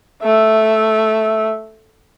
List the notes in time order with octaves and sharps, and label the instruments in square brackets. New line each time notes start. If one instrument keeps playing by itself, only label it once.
[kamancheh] A3 E5